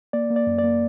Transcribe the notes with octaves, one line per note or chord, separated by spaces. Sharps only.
A#3 D5
A#3
D5
F#2
D5
A#3